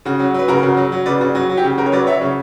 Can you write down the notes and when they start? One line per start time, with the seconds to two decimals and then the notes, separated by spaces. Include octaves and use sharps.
0.05 C#3 F#4
0.19 F#3
0.34 F#3 B4
0.48 C#3 F#4 A#4
0.63 C#3
0.77 F#3
0.92 F#3
1.06 C#3 B4 D5
1.21 C#3 F#4
1.35 F#3 F#4
1.49 F#3
1.57 G4
1.64 C#3
1.78 C#3 F#4 A#4
1.86 C#5
1.92 F#3 B4 D5
2.07 F#3 C#5 E5
2.21 C#3